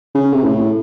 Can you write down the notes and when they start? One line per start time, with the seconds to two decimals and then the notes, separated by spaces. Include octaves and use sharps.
0.14 C#3
0.33 C3
0.44 A2